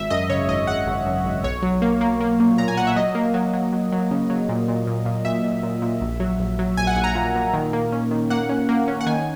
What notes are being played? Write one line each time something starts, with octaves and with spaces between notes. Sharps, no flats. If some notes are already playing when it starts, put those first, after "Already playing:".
Already playing: G#1 E5
F#2 D#5
C#3 C#5
G#1 D#5
G#1 F#5
G#1
F#2
G#1
B1 C#5
F#3
A#3
A#3
A#3
A#2
A#2 A#5
G#5
A#2 F#5
E5
F#3 D#5
A#3
F#3
F#3
F#3
F#3
C#3
F#3
A#2
A#2
A#2
A#2
A#2 E5
A#2
A#2
A#2
A#1
F#3
A#1
F#3
A#1 G#5
F#5
A#1 G#5
A#5
A#2
A#2
D#3
A#3
C#4
D#3
A#3 F#5
C#4
A#3
C#4
F#5
D#3 G#5